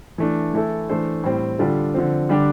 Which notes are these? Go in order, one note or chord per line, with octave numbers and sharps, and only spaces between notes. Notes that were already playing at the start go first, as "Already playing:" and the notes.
E3 A3 D4
E3 A3 E4 A4
E3 A3 D4 A4 C5
A2 G3 C4
D3 G3 D4 F4 A4
D3 F3 C4
D3 G3 D4 G4